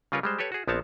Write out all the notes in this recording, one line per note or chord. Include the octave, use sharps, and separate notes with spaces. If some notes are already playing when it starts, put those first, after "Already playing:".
C#3 G3 F4 A#4 B4 C#5
G3 G#3 C5
G4 A4 B4 C#5
F#4 G#4
A#1 F3 B3 C4 C#5 A5